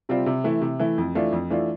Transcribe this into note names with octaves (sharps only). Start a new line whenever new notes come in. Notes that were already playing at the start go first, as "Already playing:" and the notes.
C3 G3 C4 F4
C3
E3 A3 E4
C3
E3 A3 E4
F2
E3 A3 D4 F4
F2
E3 A3 D4 F4